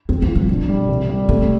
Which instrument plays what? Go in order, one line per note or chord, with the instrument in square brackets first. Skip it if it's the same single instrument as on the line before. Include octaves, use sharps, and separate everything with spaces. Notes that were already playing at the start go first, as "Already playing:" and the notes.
[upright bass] E2 [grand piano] C4
[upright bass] E2
[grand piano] F3
[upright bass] G2
[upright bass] B2 [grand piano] D4
[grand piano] G3
C2
G3
[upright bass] C3 [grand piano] A3